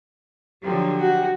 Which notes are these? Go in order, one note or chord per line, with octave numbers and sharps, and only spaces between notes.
D3 F3 F#3 G4
F#4